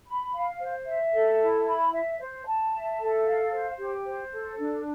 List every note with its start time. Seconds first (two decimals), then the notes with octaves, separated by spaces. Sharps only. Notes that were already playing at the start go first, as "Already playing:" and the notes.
0.07 B5
0.34 F5
0.60 C5
0.86 E5
1.14 A4
1.40 E4
1.67 B5
1.93 E5
2.20 C5
2.47 A5
2.73 E5
2.99 A4
3.26 F5
3.52 C5
3.79 G4
4.06 C5
4.32 A4
4.58 D4